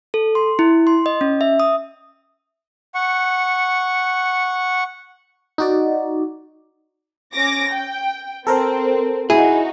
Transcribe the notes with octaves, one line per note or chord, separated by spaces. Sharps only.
A4
C6
E4
C6
D#5
C#4
E5
D#6
F#5 C#6
D#4 F#4 D5
C#4 D6 A#6
G5
C4 A4 A#4 C5
D#4 E4 F#4 G#4